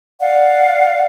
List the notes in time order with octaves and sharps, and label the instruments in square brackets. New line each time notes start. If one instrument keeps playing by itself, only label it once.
[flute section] D5 F5 F#5